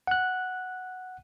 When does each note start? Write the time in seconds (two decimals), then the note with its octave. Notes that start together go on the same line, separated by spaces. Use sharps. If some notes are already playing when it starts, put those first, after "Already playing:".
0.07 F#5 F#6